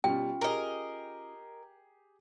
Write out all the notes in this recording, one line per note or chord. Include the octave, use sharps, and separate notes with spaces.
B2 G3 C#4 F4 G5
G4 G#4 A#4 D#5